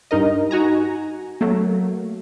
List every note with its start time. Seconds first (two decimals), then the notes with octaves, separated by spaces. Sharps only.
0.11 G2 D#4 A#4 D#5
0.51 D#4 F#4 G#5 A#5
1.41 F#3 A3 A#3